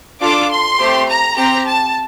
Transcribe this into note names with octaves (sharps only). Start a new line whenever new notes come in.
D4 F4 A4 D6
C6
A3 C4 G4
A#5
C4 G4 A#5
A5